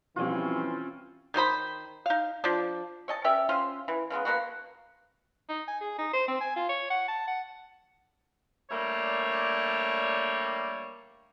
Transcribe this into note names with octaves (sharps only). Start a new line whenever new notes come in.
B2 E3 F3 G3 C4 C#4 F4 C#5
D#3 D#4 C5 B5
D#4 F5
F3 D4
C#5 D#5 A5
C#4 G4 D5 E5
C#4 F4 C5
E3
C#3 E3 G#3 B3
F3 A#3 B3 F#4
D#4
G#5
G#4
D#4
C5
C4
G#5
F4
C#5
F#5
A5
F#5
G3 A3 A#3 D4 C#5 D5